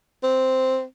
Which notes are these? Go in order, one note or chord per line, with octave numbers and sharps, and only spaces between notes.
C4